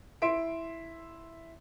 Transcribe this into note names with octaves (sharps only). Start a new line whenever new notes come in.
E4 E5 C6 D7